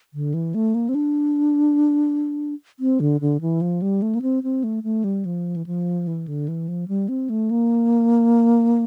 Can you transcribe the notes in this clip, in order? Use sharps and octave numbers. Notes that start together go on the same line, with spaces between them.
D3
E3
A3
A#3
C4
D4
C4
D3
D3
E3
F3
G3
A3
A#3
C4
C4
A3
A3
G3
F3
E3
F3
E3
D3
E3
F3
G3
C4
A3
A#3